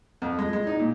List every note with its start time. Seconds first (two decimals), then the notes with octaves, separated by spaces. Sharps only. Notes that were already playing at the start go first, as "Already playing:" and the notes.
0.22 F2
0.39 G#3
0.53 G#3
0.67 D#4
0.79 A#2